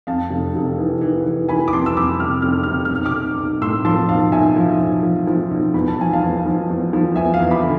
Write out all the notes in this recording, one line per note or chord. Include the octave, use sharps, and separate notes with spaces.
F2 F5 A5
F1
F1
E3
E3
E3
E3 G#5 B5
D6
F2 A5 C6
E6
F2 B5 D6
C3 F6
F1 F6
C3 F6
F6
B1
D6 F6
B1
B1
A2 C6 E6
F3 A5 C6
B1 F5 A5
B1 E5 G#5
F3
B1
F3
F3
B1
E2 B5
A5
F3 G#5
F5 A5
E2
F3
E2
F3
E2 E5 G#5
F5
E2
B5 D6
D3